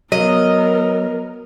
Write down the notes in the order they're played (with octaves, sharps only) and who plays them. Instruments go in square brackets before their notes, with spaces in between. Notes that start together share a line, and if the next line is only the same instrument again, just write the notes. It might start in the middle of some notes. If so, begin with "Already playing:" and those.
[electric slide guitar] F#3 [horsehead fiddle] B3 A#4 [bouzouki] D#5